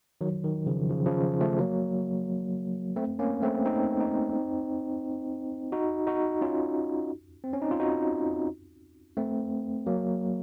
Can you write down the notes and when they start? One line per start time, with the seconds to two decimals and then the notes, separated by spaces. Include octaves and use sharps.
0.21 D#3 F#3
0.44 D#3
0.66 C#3 F3
0.89 C#3 F3
1.06 C#3 F3
1.41 F3 A3
1.59 F#3 A#3
2.96 A3 C4
3.19 A#3 C#4
3.42 A3 C4
3.66 C4 D#4
4.00 C4 D#4
5.72 D#4 F#4
6.07 D#4 F#4
6.41 C#4 F4
7.44 C4
7.53 C#4
7.62 D#4
7.71 F4
7.80 D#4 F#4
9.17 A3 C4
9.86 F#3 A#3